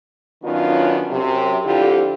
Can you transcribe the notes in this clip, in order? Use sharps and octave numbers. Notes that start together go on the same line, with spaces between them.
F#2 D#3 B3 C#4 D4 F4
F#2 C3
F2 D3 C4 E4 F4 G4